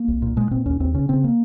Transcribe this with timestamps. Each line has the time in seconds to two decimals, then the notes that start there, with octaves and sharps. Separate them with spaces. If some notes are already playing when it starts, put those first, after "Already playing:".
Already playing: A#3
0.08 C2
0.22 A#2
0.36 A#2 G#3
0.51 A#2 C4
0.66 D#2 C#4
0.80 D#2 C4
0.94 C#3 C#4
1.09 C#3 C4
1.24 A#3